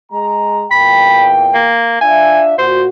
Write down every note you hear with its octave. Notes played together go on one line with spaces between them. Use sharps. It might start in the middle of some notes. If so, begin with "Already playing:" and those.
G#3 A#5
E2 A#2 G5 B5
A#3
D4 F4 E5 G#5
A#2 F#4 C5